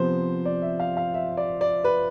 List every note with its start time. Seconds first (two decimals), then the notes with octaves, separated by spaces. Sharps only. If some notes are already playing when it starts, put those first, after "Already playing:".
Already playing: C3 F3 B3 C5
0.45 D5
0.62 E5
0.80 F5
0.97 F5
1.14 E5
1.37 D5
1.61 D5
1.84 B4